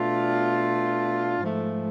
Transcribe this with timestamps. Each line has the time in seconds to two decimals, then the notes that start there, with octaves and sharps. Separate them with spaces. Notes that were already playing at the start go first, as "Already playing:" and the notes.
Already playing: B2 A3 D4 F4
1.39 G#2 F3 A3